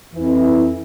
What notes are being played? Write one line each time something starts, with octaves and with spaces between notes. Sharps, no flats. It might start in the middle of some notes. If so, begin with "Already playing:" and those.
F2 E3 E4